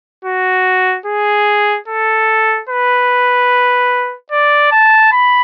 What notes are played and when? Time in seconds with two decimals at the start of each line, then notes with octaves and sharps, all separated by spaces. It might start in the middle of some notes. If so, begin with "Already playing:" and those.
0.25 F#4
1.06 G#4
1.88 A4
2.69 B4
4.32 D5
4.72 A5
5.13 B5